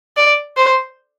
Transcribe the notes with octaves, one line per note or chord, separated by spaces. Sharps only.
D5
C5